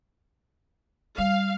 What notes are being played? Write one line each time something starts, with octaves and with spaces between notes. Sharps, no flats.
G3 F5